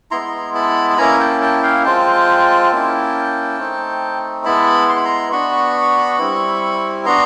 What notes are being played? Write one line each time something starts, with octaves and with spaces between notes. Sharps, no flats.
G#3 B3 E4 A#5 C6
A5 B5
B5
A#3 C#4 E4 G#5 A#5
G5 A5
G5 A5
F5 G5
G#3 C4 F4 G5 A5
A#3 C#4 E4
A3 C4 D#4
G#3 B3 E4 A5 B5
C6
B5
A#5 C6
B3 D4 F#4 B5 C#6
G3 C4 E4
B3 D4 F#4 A#5 C6